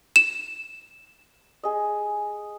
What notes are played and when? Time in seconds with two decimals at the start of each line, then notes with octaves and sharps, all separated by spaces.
0.16 E7
1.63 G#4 D#5